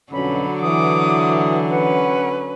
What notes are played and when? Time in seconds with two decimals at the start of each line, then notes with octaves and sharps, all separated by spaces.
0.12 F2 B2 D3 F#3 C#4 B5
0.62 E3 D6 D#6
1.68 C#4 B4 F#5